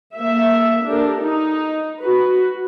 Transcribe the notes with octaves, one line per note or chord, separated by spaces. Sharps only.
A#3 E5
D4 G4 A4 A#4
D#4
F#4 B4